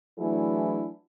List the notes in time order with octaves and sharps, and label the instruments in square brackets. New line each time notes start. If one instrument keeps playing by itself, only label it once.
[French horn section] E3 F#3 A3 D4 E4 G#4